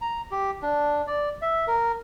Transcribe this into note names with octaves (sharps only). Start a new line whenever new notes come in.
A#5
G4
D4
D5
E5
A#4